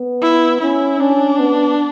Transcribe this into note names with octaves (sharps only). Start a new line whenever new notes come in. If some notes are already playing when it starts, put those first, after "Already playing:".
Already playing: B3
E4
C#4 E4
C#4 D4
B3